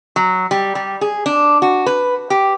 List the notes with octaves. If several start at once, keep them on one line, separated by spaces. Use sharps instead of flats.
F#3
G3
G3
G#4
D4
F#4
B4
G4